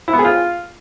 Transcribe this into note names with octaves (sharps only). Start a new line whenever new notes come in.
E4
B3
G#4
F4